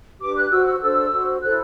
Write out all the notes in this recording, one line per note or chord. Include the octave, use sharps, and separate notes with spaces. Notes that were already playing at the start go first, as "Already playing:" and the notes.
D4 G4 B4 D6
F#6
F#4 C5 E6
E6
D4 A4 C5 E6
F#4 C5
E4 A4 C5 F#6